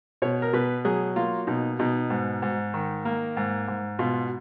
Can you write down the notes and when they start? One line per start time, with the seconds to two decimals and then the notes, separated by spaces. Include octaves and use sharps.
0.22 B2 C#5
0.42 A#4
0.53 B2 B4
0.85 F#3 G#4
1.16 A#3 F4
1.47 B2 D#4
1.79 B2 D#4
2.10 G#2
2.42 G#2
2.74 D#3
3.05 A#3
3.37 G#2
3.68 G#2
3.99 B2 F4